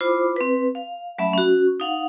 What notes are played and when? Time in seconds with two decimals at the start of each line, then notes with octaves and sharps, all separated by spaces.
0.01 E4 F4 C5 B5 D6
0.36 C4 B4
0.75 F5
1.19 F#3 A3 C#4 E5 B5
1.33 C#4 F#4
1.80 D#4 F5 F#5